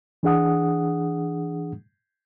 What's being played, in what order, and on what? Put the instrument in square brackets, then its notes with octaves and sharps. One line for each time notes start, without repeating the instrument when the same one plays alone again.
[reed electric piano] E3 D4 G#4 F#5 D#6